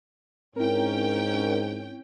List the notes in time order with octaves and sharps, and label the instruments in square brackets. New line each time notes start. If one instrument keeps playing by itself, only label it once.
[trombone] G#2 [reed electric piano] C4 E4 [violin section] C#4 G5 [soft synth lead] A#4